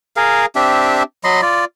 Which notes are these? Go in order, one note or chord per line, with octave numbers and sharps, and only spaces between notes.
G#4 A#4 F5
C4 D4 G4 E5
F#3 D#5 B5 C6
F4 D5